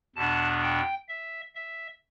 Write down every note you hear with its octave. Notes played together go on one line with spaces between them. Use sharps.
E2 B2 B3 D4 A5
G5
E5
E5